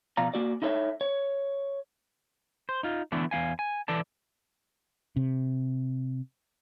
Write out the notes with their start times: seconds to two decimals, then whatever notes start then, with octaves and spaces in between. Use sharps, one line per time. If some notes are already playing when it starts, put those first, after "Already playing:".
0.17 B2 F3 D5 F5 A#5
0.34 A#3 F#4 D5
0.62 D#4 E4 A4 C5 C#5 E5
1.01 C#5
2.69 C5
2.83 D#4 F4
3.12 D3 E3 A3 B3 D4
3.31 E2 B3 F5 G#5
3.59 G#5
3.88 E3 A4 D5 A5
5.16 C3